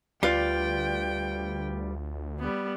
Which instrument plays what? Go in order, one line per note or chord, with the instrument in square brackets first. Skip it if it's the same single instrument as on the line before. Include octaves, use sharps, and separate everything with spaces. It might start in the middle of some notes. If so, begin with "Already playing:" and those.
[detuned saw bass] D2 [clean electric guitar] G3 B4 D5 [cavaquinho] F4 [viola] G5
[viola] G3 B3